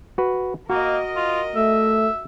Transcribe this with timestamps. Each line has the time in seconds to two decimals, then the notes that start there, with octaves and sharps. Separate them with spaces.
0.18 F#4 B4
0.70 A#3 F#4 A#4 D#5
1.16 F4
1.56 A3 E5